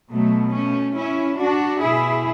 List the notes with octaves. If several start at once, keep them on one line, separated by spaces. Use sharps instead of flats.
B2 F#3 A3
A3 C#4
C#4 E4
D4 F#4
B2 E4 G#4